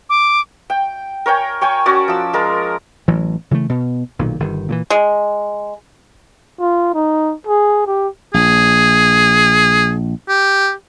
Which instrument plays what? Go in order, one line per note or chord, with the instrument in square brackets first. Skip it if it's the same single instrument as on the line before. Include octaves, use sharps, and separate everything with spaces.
[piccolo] D6
[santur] G5
A#4 C#5 G5 G#5
C#5 G5 G#5 C#6
C#4 F#4 D5
F3 E6
G#3 A#4 A5
[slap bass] A1 E3 F#3
C#3 E3 F#3 A3
B2
B1 A#2 D#3
G1 D#3
A#2 D3 E3
[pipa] G#3
[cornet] F4
D#4
G#4
G4
[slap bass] A#1 [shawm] G#4
[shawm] G4